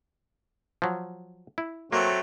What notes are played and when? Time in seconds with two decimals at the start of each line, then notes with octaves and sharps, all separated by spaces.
0.82 F3 F#3
1.58 E4
1.93 F#3 A3 A#3 C4